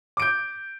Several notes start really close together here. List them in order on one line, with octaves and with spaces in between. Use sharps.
D6 D7 G6